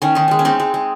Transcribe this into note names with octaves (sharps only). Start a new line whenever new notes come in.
D#3 C#4
D#3 D#4
G#3 C#4
C#4
G#3 C4 D#4
G#3
G#3